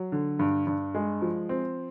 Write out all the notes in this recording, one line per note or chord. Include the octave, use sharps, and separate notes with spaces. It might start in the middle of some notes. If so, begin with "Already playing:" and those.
Already playing: F#3
D3
G2
G2
G#3
F3
C4